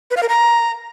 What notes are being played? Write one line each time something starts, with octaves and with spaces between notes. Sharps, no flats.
B4
F5
A#4
A#5